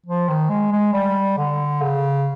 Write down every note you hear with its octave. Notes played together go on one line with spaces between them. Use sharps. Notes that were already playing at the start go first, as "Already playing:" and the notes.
F3
D#3
G#3
G#3
G3
D3
C#3